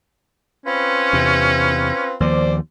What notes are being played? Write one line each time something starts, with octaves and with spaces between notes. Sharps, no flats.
C4 C#4 F4 B4
E2 C3
D#2 F3 C5 D5